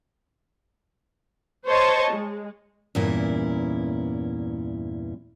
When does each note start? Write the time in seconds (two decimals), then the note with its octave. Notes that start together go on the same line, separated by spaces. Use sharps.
1.67 C5 C#5 D#5 A5 C#6
2.11 G#3
2.95 E2 G2 A#2 C#4 E4 A#4